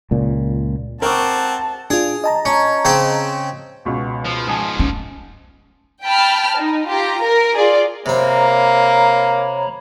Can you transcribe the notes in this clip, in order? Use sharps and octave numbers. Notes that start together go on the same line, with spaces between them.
C#2 A#2
C4 A#4 F#5 A5 C#6 D6
D4 F4 G#4
D#5 A5 A#5
C#4
C#3 C4 C5
C#2 B2
F3
G#2 F3 G#5 A5 D#6
C#4
G5 A5 B5 F6
D#4
F4 G4 A#5
A#4
F4 G#4 D5
C3 A#3 C4 C#5 A#5 B5